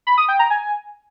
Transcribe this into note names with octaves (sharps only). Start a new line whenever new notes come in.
B5
D#6
G5
A#5
G#5